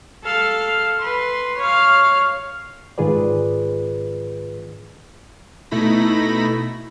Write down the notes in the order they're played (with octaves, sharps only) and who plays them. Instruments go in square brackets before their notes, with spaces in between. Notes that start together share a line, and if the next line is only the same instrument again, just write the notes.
[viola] A4 F5
B4 C6
C#5 F5
[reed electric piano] G#2 D#3 F4 G#4 B4 D5
[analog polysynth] B2 A3 D#4 E4 B5 A#6